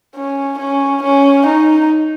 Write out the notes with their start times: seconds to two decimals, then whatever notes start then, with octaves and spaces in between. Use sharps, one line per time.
0.15 C#4
0.60 C#4
1.03 C#4
1.47 D#4